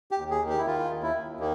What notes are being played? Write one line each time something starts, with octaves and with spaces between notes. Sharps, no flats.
G4
D#2
G#4
D#3
G4
E4
D#3 F4
D#2
E4
D#2
D#3 A#3